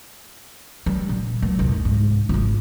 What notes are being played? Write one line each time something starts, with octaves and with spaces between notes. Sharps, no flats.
G3
A#2
A#2 F#3
F1 C2
G#2
G#1 F4